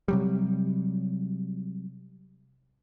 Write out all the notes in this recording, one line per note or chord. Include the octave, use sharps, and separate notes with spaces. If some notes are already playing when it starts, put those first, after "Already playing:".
C3 F#3 G3